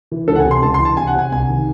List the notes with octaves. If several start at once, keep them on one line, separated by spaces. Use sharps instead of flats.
E3
C#2 A4
F#5
G#5
C3
C6
C#2 A5
C6
E3
A5
C2 G#5
F#5
C3 G#5
C2 G#5
D#3